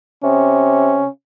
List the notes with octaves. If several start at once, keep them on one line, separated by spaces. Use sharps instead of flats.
C3 C#4